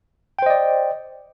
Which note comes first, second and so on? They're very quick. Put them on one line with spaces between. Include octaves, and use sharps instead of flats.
G5 C5 D#5 D5